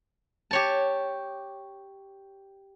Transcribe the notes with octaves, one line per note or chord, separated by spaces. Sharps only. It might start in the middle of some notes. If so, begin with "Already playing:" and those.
G4 C#5 A5